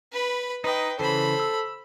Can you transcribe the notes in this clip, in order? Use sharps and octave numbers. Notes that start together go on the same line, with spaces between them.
B4 B5
D#4 B4 D#5 G5
C#3 E3 A4 C5 B5
E6